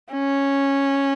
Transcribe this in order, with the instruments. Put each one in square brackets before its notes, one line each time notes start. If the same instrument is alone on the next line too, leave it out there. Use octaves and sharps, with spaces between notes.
[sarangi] C#4